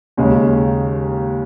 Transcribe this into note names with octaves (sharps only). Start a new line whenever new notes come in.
D#2 C#3 G#3 C#4